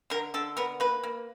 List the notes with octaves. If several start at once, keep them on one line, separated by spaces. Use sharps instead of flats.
D3 A#4
D3 A4
B3 A#4
A#3 B4
A#3